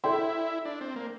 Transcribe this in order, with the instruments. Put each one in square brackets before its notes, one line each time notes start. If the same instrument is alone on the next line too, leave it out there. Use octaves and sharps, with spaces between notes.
[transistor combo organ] E4 [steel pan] A4 D5 G5 C6
[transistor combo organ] D4
C4
A#3